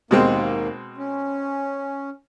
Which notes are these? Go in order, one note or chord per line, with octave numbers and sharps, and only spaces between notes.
D#2 G#2 B2 G#3 A#3 C4
C#4